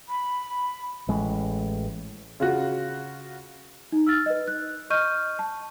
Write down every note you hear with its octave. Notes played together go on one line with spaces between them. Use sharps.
B5
A1 G#3
C#3 F4 F#4
D#4
E6 F6 A6
B4 D#5
F#6
D#5 C#6 F6 G6 D#7
A5